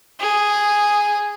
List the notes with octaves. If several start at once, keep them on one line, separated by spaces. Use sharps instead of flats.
G#4